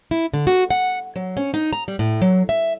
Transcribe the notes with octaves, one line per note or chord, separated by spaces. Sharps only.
E4
D3
F#4
F#5
F#3
C#4
D#4
A#5
G3
A2
F#3
E5